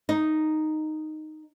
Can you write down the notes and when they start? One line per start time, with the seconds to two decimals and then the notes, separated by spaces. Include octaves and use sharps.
0.09 D#4